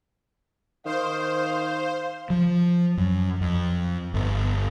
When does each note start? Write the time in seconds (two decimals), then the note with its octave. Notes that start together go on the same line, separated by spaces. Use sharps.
0.85 D#3 C5 F5
2.30 F3
2.97 F#2
3.41 F2
4.14 G1